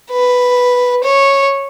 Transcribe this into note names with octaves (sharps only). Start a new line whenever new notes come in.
B4
C#5